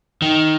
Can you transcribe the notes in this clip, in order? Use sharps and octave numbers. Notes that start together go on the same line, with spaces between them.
D#3